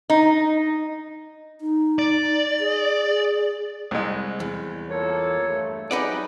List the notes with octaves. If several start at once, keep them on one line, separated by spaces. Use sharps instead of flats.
D#4
D#4
D5
G#4
C2 G#3
E2
A#3 F4 A4 C#5
G2 A3
F#3 G3 D#4 G#4 B4 D5 F#5